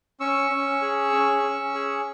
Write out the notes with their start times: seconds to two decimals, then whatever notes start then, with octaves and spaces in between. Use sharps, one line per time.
0.20 C#4 C#6 E6
0.51 C#4
0.82 G#4
1.12 C#4
1.43 C#4
1.75 G#4